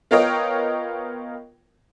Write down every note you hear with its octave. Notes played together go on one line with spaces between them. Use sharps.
B3 F4 A#4 C#5 D#5 G5